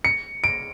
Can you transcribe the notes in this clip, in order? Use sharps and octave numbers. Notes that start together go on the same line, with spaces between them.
C#7
D7